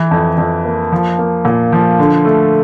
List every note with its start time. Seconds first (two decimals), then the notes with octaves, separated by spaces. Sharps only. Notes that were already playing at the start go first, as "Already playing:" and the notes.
Already playing: E3
0.11 F2
0.38 F2
0.65 A#3
0.92 F3
1.19 A#3
1.45 A#2
1.72 F3
1.99 D3
2.25 A3